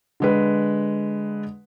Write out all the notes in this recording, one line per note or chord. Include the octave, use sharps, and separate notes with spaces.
D3 G#3 B4